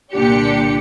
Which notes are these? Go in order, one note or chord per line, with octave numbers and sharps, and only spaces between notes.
C2 A#2 D3 D4 G4 C#7